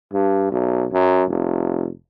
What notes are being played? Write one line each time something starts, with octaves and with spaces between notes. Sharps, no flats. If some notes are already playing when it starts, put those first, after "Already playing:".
G2
B1
F#2
F1